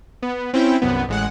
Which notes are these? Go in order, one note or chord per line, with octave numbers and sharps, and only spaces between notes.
B3
C4 C#4 E4 G5
C2 F#2 B3
A1 G#3 F#5